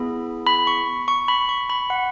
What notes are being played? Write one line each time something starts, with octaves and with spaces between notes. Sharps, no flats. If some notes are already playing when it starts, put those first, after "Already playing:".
Already playing: B3 E4 G#4 B5
B5
C#6
C#6
B5
C#6
B5
F#5